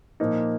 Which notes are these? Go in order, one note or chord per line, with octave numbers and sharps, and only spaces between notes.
A#2 F3 A#3 D#4